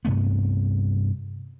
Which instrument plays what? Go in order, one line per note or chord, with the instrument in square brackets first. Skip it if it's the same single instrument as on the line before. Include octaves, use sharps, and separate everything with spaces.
[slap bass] G2 C3 A3 B3